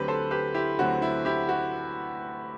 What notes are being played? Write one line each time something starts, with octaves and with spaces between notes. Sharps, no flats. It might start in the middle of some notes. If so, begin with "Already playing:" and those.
Already playing: D2 D3 F#3 C4 G4 B4
A4 C5
G4 B4
E4 G4
D2 D3 F#3 C4 F#4
E4
E4 G4
F#4